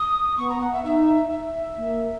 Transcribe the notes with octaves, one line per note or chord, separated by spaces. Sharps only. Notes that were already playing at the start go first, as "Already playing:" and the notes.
Already playing: D#6
B3 C#6
A#5
F#5
E5
D#4 E5
E5
A#3